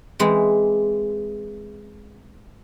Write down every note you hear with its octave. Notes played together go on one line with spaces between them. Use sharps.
E3 G#3 C4